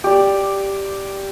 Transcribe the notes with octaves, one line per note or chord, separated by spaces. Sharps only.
G4 D5